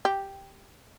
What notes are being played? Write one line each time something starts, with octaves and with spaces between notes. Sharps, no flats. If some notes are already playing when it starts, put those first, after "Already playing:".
G4